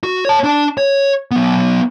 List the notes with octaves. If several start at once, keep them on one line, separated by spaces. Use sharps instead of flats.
F#4
C#5 A5
D4 A5
C#5
F#3 B3